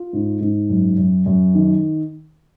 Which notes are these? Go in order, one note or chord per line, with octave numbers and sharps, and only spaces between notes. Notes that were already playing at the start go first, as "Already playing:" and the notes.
Already playing: F4
G#2
G#2
F#2
F#2
F#2
D#3